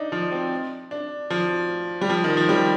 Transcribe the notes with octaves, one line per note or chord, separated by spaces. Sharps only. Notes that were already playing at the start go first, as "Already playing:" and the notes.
Already playing: D4 D#4
F3
C4
D4
F3
G3
F3
D#3
F3
G3